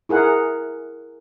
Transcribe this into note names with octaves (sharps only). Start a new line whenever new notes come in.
E4 G#4 A#4 F#5